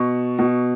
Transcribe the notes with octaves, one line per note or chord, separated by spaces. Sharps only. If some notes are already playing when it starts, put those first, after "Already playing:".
Already playing: B2 C#6
B2